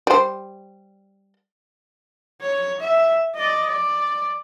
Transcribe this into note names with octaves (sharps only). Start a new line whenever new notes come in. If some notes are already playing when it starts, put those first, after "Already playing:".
G3 C5
C#5
E5
D5 D#5
D5